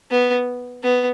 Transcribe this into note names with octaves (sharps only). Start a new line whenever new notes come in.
B3
B3